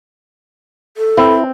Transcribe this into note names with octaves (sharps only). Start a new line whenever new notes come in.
A4
C4 E4